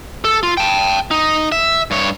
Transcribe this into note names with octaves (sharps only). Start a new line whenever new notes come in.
A4
F4
G5 A5
D#4
E5
G2 C#5